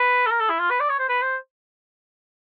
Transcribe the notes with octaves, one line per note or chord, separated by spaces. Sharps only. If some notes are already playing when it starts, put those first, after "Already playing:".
Already playing: B4
A4
A#4
A4
E4
F4
B4
D5
C#5
C5
B4
C5